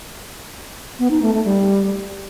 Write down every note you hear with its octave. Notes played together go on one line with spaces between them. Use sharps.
B3
D#4
A3
A3
G3